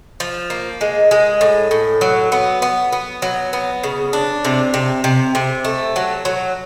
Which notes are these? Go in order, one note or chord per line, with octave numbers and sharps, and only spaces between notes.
F3
A#3
G#3
G#3
A2
A2
F#3
B3
B3
B3
F#3
B3
C#3
D4
C3
C3
C3
C3
A3
F#3
F#3